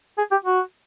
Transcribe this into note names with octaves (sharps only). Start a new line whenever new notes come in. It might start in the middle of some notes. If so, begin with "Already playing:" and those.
G#4
G4
F#4